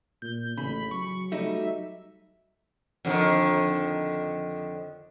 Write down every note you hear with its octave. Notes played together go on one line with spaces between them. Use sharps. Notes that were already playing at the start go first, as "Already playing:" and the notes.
A#2 G6
A1 C#3 B5
F#3 C#6
G3 A3 D#4 E5
F2 D3 D#3